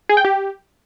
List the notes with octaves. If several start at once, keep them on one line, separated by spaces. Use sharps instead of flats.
G#4
G5
G4